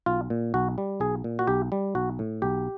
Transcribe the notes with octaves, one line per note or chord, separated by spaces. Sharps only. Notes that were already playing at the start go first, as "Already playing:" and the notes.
B1 F4
A#2
B1 F#4
G3
B1 G#4
A#2
F#4
B1 G4
G3
B1 F#4
A2
B1 G4